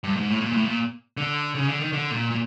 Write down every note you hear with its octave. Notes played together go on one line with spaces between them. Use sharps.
G2
G#2
A2
A#2
A2
A#2
D3
C#3
D3
D#3
D3
A#2
A#2